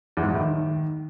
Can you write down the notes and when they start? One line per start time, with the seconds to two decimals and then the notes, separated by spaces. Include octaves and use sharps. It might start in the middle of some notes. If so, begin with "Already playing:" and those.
0.17 E2
0.23 G#2
0.28 E2
0.34 A2
0.40 D#3